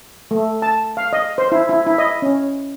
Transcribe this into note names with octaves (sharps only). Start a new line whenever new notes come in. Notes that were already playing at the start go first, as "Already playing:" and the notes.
A3
A5
F5
D#5
C5
E4
E4
E4
D#5
C#4